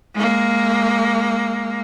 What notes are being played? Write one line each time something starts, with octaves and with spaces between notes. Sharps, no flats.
G#3 A#3